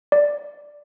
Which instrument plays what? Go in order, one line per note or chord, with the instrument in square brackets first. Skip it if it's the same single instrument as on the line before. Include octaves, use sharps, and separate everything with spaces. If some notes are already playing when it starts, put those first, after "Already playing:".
[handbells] D5